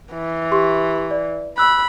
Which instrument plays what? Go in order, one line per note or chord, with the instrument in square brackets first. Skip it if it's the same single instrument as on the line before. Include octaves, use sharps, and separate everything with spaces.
[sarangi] E3
[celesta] G4 C6 C#6
D5
[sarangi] B5 [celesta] E6 F#6